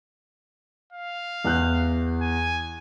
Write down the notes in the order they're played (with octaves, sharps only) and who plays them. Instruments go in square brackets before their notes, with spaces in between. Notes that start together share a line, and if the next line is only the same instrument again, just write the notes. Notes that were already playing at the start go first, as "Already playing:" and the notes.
[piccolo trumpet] F5
[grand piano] E2 F#6 G6
[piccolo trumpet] G#5